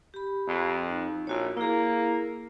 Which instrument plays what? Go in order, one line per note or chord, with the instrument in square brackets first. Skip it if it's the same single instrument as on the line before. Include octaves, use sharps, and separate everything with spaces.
[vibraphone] G4 B5
[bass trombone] F2
[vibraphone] D#4
[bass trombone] A#1 [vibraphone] F4 F#4 C#5
[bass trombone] A#3 [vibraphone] E4 G#4